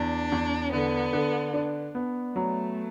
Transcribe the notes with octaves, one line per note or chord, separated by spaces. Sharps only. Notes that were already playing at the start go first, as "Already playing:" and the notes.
Already playing: E2 D4
E2
D3 B3
D3
D4
B3
F#3 A3